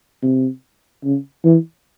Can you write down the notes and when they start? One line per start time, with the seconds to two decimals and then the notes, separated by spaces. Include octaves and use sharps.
0.23 C3
1.04 C#3
1.45 E3